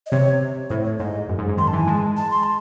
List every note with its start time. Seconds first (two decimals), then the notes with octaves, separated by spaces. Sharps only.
0.06 D#5
0.11 C3 C#5
0.70 A2 C5
0.84 C#5
0.99 G#2 D#5
1.28 F#2
1.38 G#2
1.48 G#2
1.57 D#3 C6
1.68 A5
1.73 E3
1.78 G#5
1.87 G#3 A5
2.17 A5
2.31 C6
2.44 A5